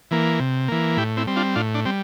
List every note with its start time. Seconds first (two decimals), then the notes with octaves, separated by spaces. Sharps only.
0.11 E3 A#3
0.40 C3
0.68 E3 A#3
0.97 A2 E4 G4
1.17 C4 E4
1.27 G3 C4
1.36 D4 F4
1.56 A2 D4 F4
1.75 D4
1.86 G3 C4